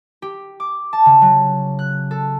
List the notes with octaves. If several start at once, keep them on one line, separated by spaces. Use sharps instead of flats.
G4
D6
A5
C#3
F#3
F#6
A4